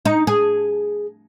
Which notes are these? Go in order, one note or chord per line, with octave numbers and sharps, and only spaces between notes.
D#4
G#4